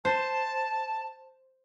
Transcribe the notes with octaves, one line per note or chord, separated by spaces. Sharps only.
C5 A5